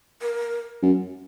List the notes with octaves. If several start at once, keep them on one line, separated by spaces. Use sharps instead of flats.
A#4
F#2